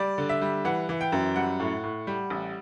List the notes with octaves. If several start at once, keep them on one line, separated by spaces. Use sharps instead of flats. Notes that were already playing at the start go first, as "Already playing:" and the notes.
Already playing: G3 D5
D3
E5
G3
E3 F#5
E3
G5
F#2
G3 F#5
A2
A2
G3
A1